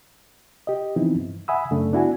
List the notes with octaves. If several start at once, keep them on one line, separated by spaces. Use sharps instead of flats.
G4 D#5
E3 F3 B3 C4 D#4 E4
G2
E5 F#5 G#5 B5 D#6 E6
F#2 C#3 A3 D4
B3 D4 E4 F#4 G#5